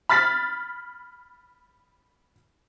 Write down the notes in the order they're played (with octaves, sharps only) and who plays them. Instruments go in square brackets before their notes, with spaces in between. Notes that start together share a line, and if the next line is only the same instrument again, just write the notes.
[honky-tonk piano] B5 F6 A6 B6